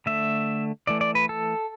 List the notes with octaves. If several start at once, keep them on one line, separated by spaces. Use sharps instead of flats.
D3 A3 E5
E3 A3 D5
D5
B4
A4